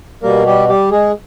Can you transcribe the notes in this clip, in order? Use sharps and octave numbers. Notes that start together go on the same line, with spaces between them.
B2 G3 A#3 A#4
G3 G4
G3 G4
G#3 G#4